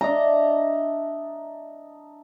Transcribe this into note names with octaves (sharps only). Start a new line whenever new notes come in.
D4 D#5 E5 A#5